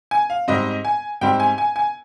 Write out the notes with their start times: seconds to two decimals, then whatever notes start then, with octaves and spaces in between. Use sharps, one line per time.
0.11 G#5
0.30 F5
0.48 G#2 G3 C4 D#5
0.85 G#5
1.21 G#2 G3 C4 G5
1.40 G#5
1.58 G#5
1.76 G#5